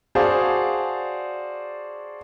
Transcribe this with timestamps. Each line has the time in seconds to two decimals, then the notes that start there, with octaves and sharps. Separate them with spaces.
0.15 F#4 G#4 C5 D5 F5 A5